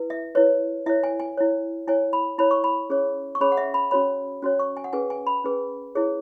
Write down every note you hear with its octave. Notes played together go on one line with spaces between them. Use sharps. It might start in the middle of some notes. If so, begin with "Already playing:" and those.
Already playing: E4 B4
E5
E4 B4 C#5
E4 C#5 E5
G#5
G#5
E4 C#5
E4 C#5 G#5
B5
E4 C#5 B5
C#6
B5
C#4 G#4 C#5
C#6
C#4 G#4 C#5 B5
F#5
E5
B5
C#4 F#4 C#5 B5
C#4 F#4 C#5
C#6
G#5
F#5
C#4 G#4 B4 G#5
G#5
B5
C#4 G#4 B4
E4 G#4 C#5